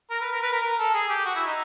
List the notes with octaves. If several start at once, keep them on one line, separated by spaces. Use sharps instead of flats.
A#4
B4
A#4
B4
A#4
A#4
A4
G#4
G4
F#4
E4
D#4